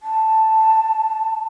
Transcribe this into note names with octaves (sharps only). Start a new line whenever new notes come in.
A5